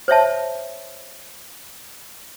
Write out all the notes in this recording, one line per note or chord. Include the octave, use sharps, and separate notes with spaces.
C5 C#5 E5 A5